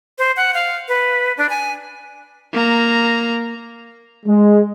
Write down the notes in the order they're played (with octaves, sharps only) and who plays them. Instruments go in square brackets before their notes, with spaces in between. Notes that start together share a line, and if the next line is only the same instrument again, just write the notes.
[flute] C5
F#5
F5
B4
D4
G#5
[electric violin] A#3 A#5
[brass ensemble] G#3